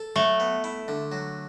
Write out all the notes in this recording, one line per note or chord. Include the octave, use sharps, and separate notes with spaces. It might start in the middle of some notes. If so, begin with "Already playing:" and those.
Already playing: A4
F#3 A3
B3
E4
D3
F#3